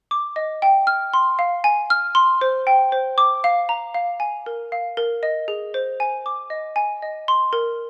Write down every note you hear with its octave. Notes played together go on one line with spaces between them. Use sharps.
D6
D#5
G5
F6
C6
F5
G#5
F6
C6
C5
G5
C5
D6
F5
A#5
F5
G#5
A#4
F5
A#4
D#5
G#4
C5
G#5
D6
D#5
G#5
D#5
C6
A#4